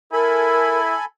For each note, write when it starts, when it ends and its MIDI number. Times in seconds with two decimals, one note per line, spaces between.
0.13 0.94 64
0.13 1.05 69
0.13 0.79 70
0.13 1.05 80
0.13 1.05 83